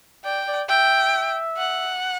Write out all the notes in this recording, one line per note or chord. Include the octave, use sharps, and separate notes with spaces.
D5 G5
D5
E5 G5
F#5